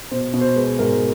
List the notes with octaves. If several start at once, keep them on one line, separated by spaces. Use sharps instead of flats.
B2 C5
B2
C5
G#3 B4
G#2 A#4